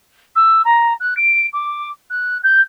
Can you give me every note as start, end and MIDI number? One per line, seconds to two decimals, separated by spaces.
0.36 0.62 88
0.65 0.93 82
1.00 1.17 90
1.17 1.47 98
1.53 1.89 86
2.10 2.38 90
2.43 2.61 91